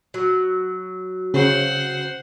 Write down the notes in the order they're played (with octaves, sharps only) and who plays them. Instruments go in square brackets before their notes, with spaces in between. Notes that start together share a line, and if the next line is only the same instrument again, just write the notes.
[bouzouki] F#3
[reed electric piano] C#3 [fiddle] C5 F#5